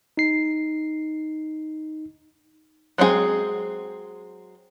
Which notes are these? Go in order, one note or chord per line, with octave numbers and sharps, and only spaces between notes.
D#4 C7
F#3 G#3 C4 F#4 G#4